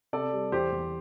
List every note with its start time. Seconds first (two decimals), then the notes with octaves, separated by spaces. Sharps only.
0.13 C3 A4 D5
0.33 G3
0.52 E2 G4 C5
0.72 E2